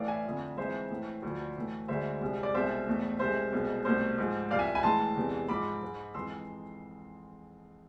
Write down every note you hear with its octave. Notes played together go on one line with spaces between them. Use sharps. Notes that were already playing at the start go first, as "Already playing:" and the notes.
Already playing: A2 E3 A3 D5 F5
E5 G#5
F2 D3 F3
F2 E3 G#3 C5 E5
A2 E3 A3
D2 D3 F3
A2 E3 A3
D2 D3 G#3 C5 E5
C2 C3 G#3
D5
C2 B2 G#3 C5 E5
E2 B2 A3
C2 C3 G#3 C5 E5
C2 B2 G#3
C2 B2 A3 C5
G#2 F3 G#3
C2 C3 F3 D5 F5
E5 G#5
G#5 B5
A2 E3 G#3 A5 C6
E2 C3 E3 G#3
G#2 F3 G#3 B5 D6
G#2 G#3
F2 E3 G#3 C6 E6